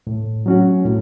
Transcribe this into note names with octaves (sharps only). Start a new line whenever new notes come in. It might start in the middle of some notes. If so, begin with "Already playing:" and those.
A2
F#3 C#4 F#4
A2